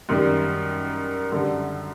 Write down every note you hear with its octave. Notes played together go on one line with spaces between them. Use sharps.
F#2 D#3 G3
F#2 D3 G3